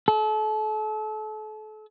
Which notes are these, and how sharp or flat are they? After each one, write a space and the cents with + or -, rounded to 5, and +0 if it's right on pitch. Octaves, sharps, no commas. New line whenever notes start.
A4 -35